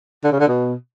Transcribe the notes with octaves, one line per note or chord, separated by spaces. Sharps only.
D3
C#3
D3
B2